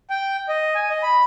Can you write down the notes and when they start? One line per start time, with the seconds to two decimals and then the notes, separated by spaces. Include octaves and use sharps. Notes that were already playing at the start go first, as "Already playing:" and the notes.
0.10 G5
0.48 D#5
0.75 G#5
0.90 D#5
1.03 B5